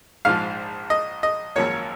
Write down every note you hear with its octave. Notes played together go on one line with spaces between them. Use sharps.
A#1 G#2 F3 F5
D#5
D#5
G#1 F#2 F3 A#3 C#5